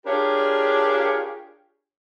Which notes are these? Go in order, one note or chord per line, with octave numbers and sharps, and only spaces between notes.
D4 F4 G4 G#4 A#4 C#5